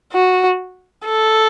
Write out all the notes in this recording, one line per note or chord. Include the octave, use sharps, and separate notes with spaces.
F#4
A4